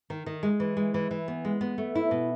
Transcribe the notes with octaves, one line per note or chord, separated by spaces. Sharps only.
D#3
D#3
G#3
E3
G#3
E3
E3
B3
G#3
B3
A3
E4
B2